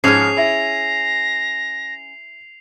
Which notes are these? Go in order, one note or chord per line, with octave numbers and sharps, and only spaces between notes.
G#2 F3 C#4 D#4 G#4 F6 C7 F7
E4 E5 A#6